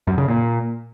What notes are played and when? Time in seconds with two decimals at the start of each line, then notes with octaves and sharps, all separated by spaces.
0.07 F#2
0.18 C#3
0.28 A#2